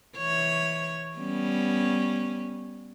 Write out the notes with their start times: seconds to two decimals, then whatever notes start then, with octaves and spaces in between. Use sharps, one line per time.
0.17 E3 C#5
1.17 G3 B3 C#4